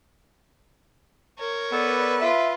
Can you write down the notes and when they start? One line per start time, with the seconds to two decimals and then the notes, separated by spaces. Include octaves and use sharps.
1.39 A#4 C#5
1.72 B3 A4 B4 D5
2.21 F4 E5